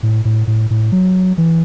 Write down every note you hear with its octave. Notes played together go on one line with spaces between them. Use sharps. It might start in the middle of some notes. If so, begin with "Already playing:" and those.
A2
A2
A2
A2
F#3
E3